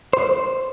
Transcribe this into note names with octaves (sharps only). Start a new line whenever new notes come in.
C5